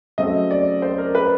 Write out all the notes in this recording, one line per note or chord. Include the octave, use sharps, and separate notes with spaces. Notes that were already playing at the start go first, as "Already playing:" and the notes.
C#3 F#3 A3 C4 D#5
D5
C5
A#4
B4